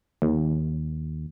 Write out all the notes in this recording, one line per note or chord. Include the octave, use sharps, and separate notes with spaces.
D#2